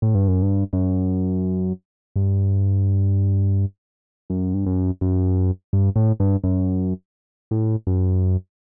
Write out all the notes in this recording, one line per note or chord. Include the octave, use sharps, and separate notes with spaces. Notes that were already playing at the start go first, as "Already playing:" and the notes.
A2
G2
F#2
G2
F#2
G2
F#2
G2
F#2
F#2
G2
A2
G2
F#2
A2
F#2